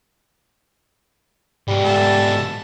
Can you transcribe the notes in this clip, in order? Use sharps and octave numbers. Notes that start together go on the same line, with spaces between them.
G#2 B2 G3
A4 E5 A5